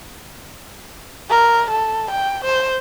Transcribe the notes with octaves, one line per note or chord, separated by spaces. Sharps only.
A#4
A4
G5
C5